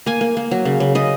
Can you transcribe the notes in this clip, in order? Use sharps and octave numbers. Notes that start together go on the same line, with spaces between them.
A#3 G#5
A#3
A#3
F#3
C#3
C#3
C#3 D#5